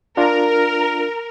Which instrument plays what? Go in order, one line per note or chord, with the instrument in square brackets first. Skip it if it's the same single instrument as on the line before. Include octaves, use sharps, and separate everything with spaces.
[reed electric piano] D4 F4 [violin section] A#4